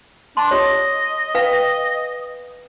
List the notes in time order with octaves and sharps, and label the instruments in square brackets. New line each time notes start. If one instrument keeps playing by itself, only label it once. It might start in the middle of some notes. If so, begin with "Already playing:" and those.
[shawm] D4 [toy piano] A5 C6
[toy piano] G4 C#5 [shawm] D#5
[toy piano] B4 F5 G5